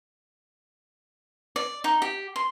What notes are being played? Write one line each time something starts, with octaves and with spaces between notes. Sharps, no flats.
D5
D#4
G4
C6